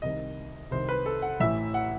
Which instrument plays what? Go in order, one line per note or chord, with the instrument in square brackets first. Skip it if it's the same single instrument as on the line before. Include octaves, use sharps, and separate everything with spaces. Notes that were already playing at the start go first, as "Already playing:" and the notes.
[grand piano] C2 C3 D#3 D#5
C2 C3 D#3 C5
B4
A4
F#5
A1 A2 E3 E5
F#5